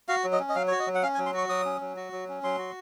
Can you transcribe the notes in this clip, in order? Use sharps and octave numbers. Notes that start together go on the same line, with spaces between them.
F#4 F5
F#3
D#5
C#4
D#5
F#3 F5
F#4 C#5
D#5
F#3
F#5
C#4 F5
G#5
F#3
C6
F#4 C#6
F#3 D#6
C#4
F#3
F#4
F#3
C#4
F#3 C6
F#4